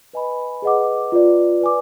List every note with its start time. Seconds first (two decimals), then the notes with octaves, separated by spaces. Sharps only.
0.13 B4 D#5 G#5 B5
0.62 G#4 B4 D#5 F#5 D6
1.12 F4 B4 D5
1.61 B4 D5 G#5 D6